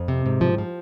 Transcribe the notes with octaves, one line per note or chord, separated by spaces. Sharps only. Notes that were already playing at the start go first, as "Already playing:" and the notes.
Already playing: F2
C3
G#2
F3
F3